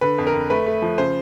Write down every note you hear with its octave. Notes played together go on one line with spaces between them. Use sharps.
D3 B4
F2
A#4
F2
A3 B4
A3
F3
C#3 C5